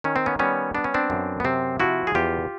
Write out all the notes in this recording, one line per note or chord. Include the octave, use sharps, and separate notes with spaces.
D#3 C#4
C4
B3 C#4
G3 B3 C#4
B3 D4
C#4
C4 D4
F#2
B3
C3 C4
F3 E4 F#4
G#4
E2 F4 G4